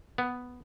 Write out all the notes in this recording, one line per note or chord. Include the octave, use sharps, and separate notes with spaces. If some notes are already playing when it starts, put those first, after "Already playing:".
B3